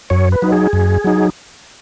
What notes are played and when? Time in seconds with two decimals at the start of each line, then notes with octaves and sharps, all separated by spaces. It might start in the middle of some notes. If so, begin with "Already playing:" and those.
0.10 F#2 C#5
0.32 B4
0.42 F#3 D#4
0.52 G#4
0.73 F#2
1.04 F#3 D#4